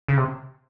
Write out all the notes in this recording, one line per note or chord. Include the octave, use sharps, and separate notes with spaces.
C#3
C3